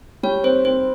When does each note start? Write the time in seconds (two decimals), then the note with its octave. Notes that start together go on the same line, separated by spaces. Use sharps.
0.23 G3 C#5
0.44 C4 C5
0.65 C4 C5